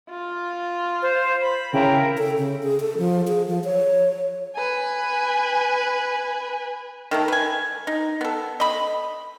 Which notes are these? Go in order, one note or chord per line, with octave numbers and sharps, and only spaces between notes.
F4
C5 F5
B5
C#3 E4 A#4 G5 A#5
A4
C#3
G#4
A4
F3
G#4
F3
C#5
B4 G#5
D#3 A3 A#3
B4 G#5
D#4
B3 A4
D#5 B5